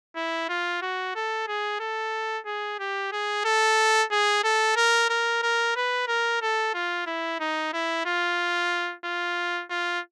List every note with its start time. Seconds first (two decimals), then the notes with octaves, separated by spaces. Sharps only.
0.16 E4
0.49 F4
0.82 F#4
1.16 A4
1.48 G#4
1.80 A4
2.46 G#4
2.79 G4
3.12 G#4
3.45 A4
4.12 G#4
4.44 A4
4.77 A#4
5.10 A#4
5.43 A#4
5.76 B4
6.08 A#4
6.42 A4
6.74 F4
7.07 E4
7.40 D#4
7.74 E4
8.06 F4
9.05 F4
9.70 F4